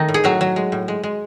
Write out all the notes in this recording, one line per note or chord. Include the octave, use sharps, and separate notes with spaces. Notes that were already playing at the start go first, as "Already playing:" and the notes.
Already playing: D#3 A3 D#4
A2
G#4
A2 F#3 F#4
F#3
G#3
A2
G#3
G#3